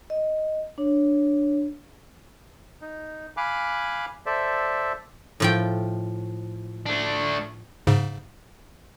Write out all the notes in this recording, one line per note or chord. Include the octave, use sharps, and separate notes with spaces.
D#5
D4 C#5
D#4
F5 G#5 B5 D6 F#6
A4 C5 D5 E5
A2 F3 G5
A3 D4
G#2 C#3